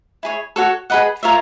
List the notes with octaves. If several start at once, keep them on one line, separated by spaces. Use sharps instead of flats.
E4 G#4 C#5
F#4 A4 C#5
G#4 B4 D#5 F#5
F4 A#4 C#5 E5